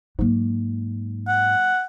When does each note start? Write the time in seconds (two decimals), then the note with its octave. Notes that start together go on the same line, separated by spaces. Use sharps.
0.19 G#2 F#3 A#3
1.28 F#5